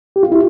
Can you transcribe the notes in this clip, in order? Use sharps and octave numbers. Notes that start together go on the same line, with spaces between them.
G4
F4
E4